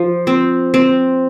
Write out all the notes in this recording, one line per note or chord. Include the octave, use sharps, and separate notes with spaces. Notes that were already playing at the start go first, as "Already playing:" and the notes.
Already playing: F3
C4
C4